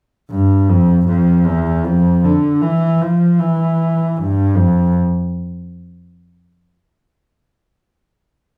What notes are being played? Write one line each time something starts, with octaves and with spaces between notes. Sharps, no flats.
G2
F2
F2
E2
F2
D3
E3
F3
E3
G2
F2